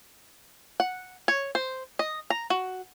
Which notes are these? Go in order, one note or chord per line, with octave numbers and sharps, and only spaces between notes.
F#5
C#5
C5
D#5
A#5
F#4